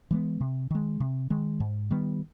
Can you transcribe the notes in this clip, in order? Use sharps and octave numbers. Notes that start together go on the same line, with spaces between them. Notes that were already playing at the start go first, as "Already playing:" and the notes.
E3 G#3 B3
C3
D#3 G#3
C3
D#3 G#3
G#2
D#3 G3 B3